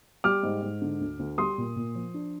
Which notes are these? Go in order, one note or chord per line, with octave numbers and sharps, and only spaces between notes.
G3 D6 F6
G#2
G#2
D3
D2
D2
G3 C6 D#6
A#2
A#2
F3
D4